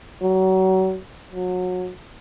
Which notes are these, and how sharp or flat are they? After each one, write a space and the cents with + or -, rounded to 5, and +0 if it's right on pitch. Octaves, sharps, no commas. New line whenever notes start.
F#3 +30
F#3 -25